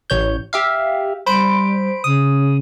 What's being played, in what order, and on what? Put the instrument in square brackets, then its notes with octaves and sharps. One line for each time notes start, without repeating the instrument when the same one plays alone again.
[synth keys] A1 C#5 G6
G4 E5 F5
[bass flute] G3 [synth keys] C5 B5 D7
[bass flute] C#3 [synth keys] D#6